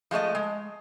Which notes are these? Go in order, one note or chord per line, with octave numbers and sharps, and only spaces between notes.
F3 G#3 A3 D#5
G#3